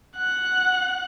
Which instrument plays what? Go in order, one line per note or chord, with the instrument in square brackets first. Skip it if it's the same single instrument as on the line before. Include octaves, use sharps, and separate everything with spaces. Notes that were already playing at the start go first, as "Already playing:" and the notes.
[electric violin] F#5 F#6